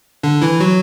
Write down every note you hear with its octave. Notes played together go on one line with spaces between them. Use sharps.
D3 D4
E3 E4
F#3 F#4